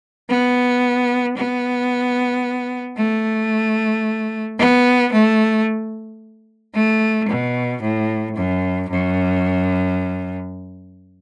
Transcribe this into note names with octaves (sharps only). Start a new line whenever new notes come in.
B3
B3
A3
B3
A3
A3
B2
A2
F#2
F#2